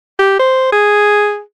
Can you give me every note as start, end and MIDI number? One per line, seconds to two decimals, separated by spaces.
0.19 0.38 67
0.39 0.71 72
0.72 1.40 68